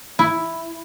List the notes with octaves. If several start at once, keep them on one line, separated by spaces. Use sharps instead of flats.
E4